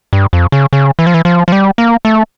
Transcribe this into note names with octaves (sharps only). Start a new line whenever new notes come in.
G2
F2
C#3
C#3
E3
F3
E3
F3
F3
G3
A#3
A3